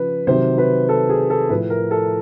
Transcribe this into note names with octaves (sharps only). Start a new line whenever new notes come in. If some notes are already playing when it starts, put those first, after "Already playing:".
Already playing: C#3 F3 B4
C3 D#3 F#3 C5
B4
A4
G#4
A4
A2 F3 B4
A#4
A4